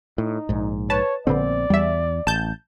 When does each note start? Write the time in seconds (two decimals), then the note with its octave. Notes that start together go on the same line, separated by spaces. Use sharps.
0.18 A2 D#4
0.49 A#1 G#2
0.90 B4 C#5 A5
1.27 A#1 A#2 D3 B3 C4 D5
1.70 E2 G3 E5
2.27 A1 A5 G6